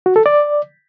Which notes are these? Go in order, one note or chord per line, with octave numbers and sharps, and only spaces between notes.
F#4
A4
D5